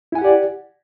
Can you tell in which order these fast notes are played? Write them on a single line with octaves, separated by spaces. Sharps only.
E4 G#5 F#5 G4 D5